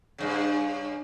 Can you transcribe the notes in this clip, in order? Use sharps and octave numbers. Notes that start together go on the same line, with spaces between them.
G2 C#3